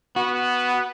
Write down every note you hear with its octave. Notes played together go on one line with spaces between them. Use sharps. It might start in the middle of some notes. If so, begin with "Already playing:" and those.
B3 F#4